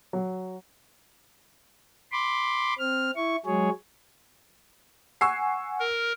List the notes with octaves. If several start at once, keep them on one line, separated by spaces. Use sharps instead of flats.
F#3
B5 C6 D6
C4 F6
E4 C#6
F#3 G#3 G#4 C#5
F#5 G#5 C#6 E6 C7
A#4